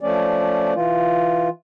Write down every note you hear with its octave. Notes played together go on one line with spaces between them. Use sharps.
F3 A3 C#4 D5
E3 F4